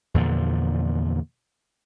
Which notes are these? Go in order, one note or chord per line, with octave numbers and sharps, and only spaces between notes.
E2 A#2 D3 F3